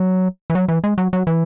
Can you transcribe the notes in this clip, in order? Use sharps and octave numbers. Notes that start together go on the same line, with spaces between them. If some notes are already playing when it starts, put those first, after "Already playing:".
Already playing: F#3
E3
F#3
E3
G#3
F#3
F#3
E3